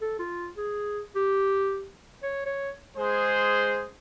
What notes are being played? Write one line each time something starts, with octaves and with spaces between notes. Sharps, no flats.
A4
F4
G#4
G4
C#5
C#5
G#3 G#4 C5